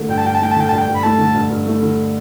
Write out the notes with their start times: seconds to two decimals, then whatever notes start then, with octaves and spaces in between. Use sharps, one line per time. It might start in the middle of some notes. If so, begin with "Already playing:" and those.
Already playing: D3 A3
0.08 G2 G5
0.18 A5
0.25 G2 G5
0.35 A5
0.41 A3 G5
0.51 A5
0.56 D3 G5
0.69 G2 A5
0.78 G5
0.88 G2
0.95 B5
1.03 A3 A5
1.18 D3
1.34 G2
1.50 G2
1.67 A3
1.82 D3